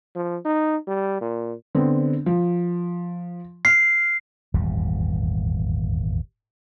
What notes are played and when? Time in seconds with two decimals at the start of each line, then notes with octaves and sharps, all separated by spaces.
0.16 F3
0.45 D#4
0.87 G3
1.21 A#2
1.75 D3 B3 C4
2.26 F3
3.65 F6 C7
4.54 D#1 G#1 E2 G3